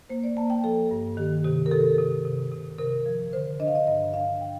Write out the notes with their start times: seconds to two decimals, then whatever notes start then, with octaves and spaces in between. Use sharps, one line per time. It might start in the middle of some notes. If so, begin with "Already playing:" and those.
0.09 A#3 C5
0.24 D5
0.37 A#3 A5
0.50 G5
0.64 F3 A4
0.91 G2
1.17 D#3 G4
1.44 C3 G4
1.66 A#4
1.71 C3 A4
1.98 C3
2.25 C3
2.52 C3
2.79 C3 A#4
3.06 F3
3.33 D3 C5
3.60 D4 D#5
3.67 F5
3.75 D#5
3.87 G2 D#5
4.14 D4 F5
4.41 G5